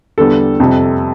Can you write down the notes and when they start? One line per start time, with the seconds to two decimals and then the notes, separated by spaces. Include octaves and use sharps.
0.18 E2 D3 G3 A4
0.60 F2 C3 G3